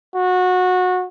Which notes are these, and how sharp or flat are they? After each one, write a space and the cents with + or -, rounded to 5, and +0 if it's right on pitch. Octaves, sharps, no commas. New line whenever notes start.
F#4 -20